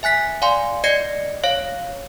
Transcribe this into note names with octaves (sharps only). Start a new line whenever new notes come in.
E5 G#5 F#6 B6
D5 F5 G#5 C6
D5 D#5 G#6 A#6 C7 C#7
C#5 F5 A#6